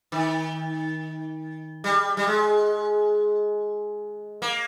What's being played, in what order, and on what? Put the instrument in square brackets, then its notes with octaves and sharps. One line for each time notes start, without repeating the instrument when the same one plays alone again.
[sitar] D#3
G3
G3
G#3
A#3